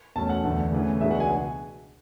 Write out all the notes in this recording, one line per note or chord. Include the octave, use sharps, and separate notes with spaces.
E2 B2 A3 C#4 A5
F#5
E2 D3 A3
C#3 E3 A3
C#2 B2 G#3 D4 E5
F#5
G#5